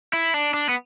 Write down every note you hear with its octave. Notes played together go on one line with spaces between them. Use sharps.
E4
D4
D4
B3